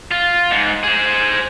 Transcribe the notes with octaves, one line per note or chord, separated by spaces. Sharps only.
F4
G#2
G#4 C5